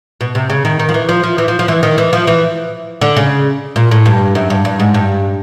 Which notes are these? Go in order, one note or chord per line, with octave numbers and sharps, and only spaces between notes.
B2
C3
C#3
D#3
D#3
F3
E3
F3
F3
E3
F3
F3
E3
D#3
E3
F3
E3
D3
C#3
A#2
A2
G2
F#2
G2
G2
G#2
G2